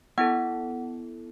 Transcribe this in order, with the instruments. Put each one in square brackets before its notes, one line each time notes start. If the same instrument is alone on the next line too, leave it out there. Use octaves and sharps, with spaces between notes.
[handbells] B3 E4 A4 F#5